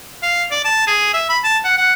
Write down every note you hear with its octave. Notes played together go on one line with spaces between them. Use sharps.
F5
D5
A5
G#4
E5
B5
A5
F#5
F#5